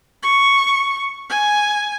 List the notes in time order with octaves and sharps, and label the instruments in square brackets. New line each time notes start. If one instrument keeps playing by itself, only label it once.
[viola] C#6
G#5